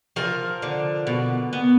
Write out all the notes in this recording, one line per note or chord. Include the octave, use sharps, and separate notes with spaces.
F3 A#4
D3
B2
B3